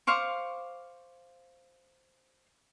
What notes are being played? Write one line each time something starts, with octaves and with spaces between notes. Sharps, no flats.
C5 F5 C#6 D6